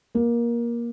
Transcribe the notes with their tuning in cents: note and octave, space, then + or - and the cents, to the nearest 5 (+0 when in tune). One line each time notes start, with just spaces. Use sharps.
A#3 +20